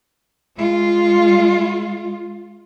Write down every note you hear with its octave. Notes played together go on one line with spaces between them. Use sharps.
G#3 F4